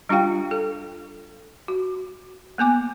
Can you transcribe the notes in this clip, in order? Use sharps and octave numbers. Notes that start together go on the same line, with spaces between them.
G3 D4 F4 G4 F5 G5
A4
F#4
A#3 B3 G#5 D6